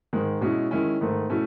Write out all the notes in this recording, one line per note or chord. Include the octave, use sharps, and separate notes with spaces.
G#2 D#3 G#3
B2 G#3 C#4 E4
D#3 G#3 C#4 E4
G#2 D#3 A3
B2 A3 C#4 E4